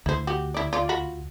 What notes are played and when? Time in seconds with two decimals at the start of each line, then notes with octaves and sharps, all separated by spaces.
0.06 D2 E4 C5
0.27 F#4 G4
0.54 E4 D5
0.73 F4 D5
0.89 F4 F#4 B5